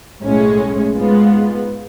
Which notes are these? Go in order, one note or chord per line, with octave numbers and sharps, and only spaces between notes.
B1 A2 G#3 C#4
G#2 G#3 B3 F4